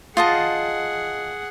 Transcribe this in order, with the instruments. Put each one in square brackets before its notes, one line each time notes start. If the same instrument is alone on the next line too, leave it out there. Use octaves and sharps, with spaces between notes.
[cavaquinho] F4 D#5 A5 [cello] G#4 F#5